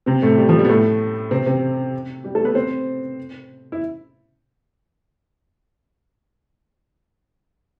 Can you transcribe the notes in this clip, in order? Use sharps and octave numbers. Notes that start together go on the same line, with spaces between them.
C3 C4
A2 A3
G3
F3
G3
B3
A2 A3
C3 C4
C3 C4
G3 G4
A3 A4
B3 B4
C4 C5
E4